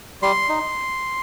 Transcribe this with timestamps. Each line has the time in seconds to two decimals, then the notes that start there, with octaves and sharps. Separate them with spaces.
0.22 G3 C6
0.49 D#4